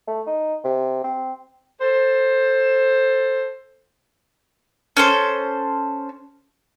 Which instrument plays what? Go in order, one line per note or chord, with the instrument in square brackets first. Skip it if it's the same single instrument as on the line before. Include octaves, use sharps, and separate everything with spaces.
[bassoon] A3
D#4
C3
C4
[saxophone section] A4 C5
[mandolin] C#4 A4 C5